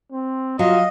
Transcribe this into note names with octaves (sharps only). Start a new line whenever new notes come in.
C4
F#3 F4 D#5 F5